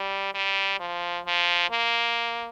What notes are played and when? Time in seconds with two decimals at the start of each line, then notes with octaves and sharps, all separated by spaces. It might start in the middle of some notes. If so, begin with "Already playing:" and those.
Already playing: G3
0.35 G3
0.80 F3
1.26 F3
1.70 A#3